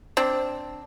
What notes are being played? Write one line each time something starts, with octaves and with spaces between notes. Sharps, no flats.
C4 D4